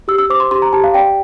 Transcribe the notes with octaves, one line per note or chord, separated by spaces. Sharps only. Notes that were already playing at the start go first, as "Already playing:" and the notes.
G4 E6
E6
C5 D6
C6
G4 C6
A#5
G4 A5
F5
D5 G5